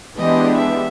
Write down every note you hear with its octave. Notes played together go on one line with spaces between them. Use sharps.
E3 G#3 B3 D4 G4 D#5
E5